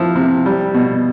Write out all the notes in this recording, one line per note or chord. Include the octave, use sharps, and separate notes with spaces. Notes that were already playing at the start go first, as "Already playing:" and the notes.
Already playing: F3 E4
C3
G3
B2